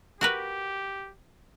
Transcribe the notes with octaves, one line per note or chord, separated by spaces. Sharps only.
F#4 G4 A#4 B4